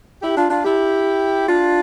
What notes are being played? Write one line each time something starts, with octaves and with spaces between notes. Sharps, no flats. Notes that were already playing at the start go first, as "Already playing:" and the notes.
E4 G4
D4 F4
D4 F4
E4 G4
D4 F4